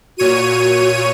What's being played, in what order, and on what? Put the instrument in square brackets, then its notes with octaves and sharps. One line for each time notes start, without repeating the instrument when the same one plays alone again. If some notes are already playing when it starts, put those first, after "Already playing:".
[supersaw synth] A#2 C#5 D#7 [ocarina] F#4